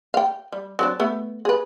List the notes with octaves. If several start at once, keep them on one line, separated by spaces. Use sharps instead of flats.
F5 G5
G3
F#3 C4 D4
A3 B3
G#4 B4